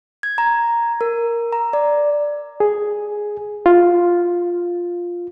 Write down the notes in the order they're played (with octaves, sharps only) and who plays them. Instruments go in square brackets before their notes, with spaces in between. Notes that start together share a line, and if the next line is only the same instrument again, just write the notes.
[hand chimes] G#6
A#5
A#4
A#5
D5
[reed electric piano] G#4
F4